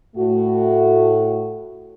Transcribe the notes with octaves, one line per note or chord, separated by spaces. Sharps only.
A2 A3 F#4